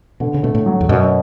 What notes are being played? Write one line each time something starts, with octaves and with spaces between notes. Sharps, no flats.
B2 D3
C#3
B2 A3
A2
F#3
E2
F#2 B2